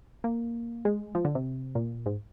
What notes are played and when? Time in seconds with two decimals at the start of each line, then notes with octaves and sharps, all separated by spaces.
0.24 A#3
0.85 G#3
1.15 F3
1.25 D3
1.35 C3
1.75 A#2
2.06 G#2